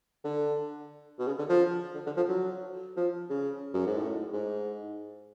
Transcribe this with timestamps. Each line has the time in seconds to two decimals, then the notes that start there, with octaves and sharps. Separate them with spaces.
0.24 D3
1.19 B2
1.27 C#3
1.39 D3
1.49 F3
1.95 D3
2.06 D3
2.17 F3
2.28 F#3
2.97 F3
3.30 C#3
3.74 F#2
3.86 G#2
3.98 A2
4.33 G#2